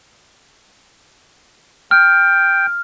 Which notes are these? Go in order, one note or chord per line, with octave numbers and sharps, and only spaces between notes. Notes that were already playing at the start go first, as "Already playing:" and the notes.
G5 F6